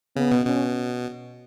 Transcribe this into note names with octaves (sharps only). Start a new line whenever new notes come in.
C#3 B3
B2
B2 C#4